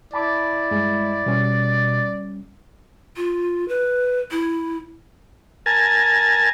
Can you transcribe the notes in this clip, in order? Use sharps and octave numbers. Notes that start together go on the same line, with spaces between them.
E4 D5 A5 B5 D6
G2 G#3
B2 G3 C#4
F4
B4
E4
A#4 G#5 A5